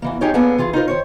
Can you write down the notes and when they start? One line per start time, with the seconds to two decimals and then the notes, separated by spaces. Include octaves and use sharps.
0.02 E2 E3 A#3
0.21 C#4 D#4 G4 G#4 C#5 D#5
0.34 A#3 B3 C#4 D4 G#4 A4
0.58 E3 F4 G#4
0.73 D#4 F4 A#4 C5
0.88 D#3 C5 C#5